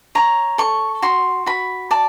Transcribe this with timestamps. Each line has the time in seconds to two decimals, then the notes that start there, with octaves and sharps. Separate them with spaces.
0.15 C#5 A#5
0.58 A4 C#6
1.02 F#4 C6
1.46 F#4 B5
1.91 D5 A5